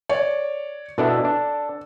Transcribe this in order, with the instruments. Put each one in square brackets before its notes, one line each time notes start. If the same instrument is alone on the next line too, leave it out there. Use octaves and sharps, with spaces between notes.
[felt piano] C#5 D5
[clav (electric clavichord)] B2 D4 E4 [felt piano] A4
[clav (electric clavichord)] D4